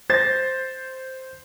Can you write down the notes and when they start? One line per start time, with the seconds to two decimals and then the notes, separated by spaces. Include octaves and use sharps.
0.10 C5 A6 A#6